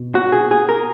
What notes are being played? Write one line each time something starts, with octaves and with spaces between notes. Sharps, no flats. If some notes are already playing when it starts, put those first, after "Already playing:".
Already playing: B2
F#4
G#4
G#4
A#4